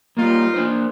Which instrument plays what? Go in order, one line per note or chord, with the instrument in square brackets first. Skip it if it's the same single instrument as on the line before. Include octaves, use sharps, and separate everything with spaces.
[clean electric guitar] G3 A#3 [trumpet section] D#4 F4
[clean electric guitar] A#3 D4 C5